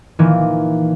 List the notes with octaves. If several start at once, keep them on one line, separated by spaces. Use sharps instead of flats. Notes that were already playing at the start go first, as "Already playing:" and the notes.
A#2 D#3 E3